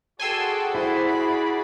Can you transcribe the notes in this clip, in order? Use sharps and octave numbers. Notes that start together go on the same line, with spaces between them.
F#4 G#4 A4 D5 G5 G#5 C6 E6
E4 C5
B5